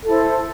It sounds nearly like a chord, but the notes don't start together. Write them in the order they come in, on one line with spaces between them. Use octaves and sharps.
A4 E4 C5